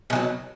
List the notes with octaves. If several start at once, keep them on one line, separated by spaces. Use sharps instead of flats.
B2 F#3 G#3